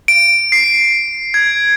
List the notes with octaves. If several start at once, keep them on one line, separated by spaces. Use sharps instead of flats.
D7
C7
G#6